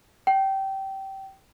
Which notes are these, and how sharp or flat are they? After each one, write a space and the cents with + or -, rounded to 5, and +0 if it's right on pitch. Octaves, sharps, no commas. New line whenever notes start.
G5 -20